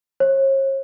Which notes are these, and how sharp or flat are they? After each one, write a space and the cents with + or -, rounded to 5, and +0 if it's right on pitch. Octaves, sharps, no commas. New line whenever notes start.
C#5 -45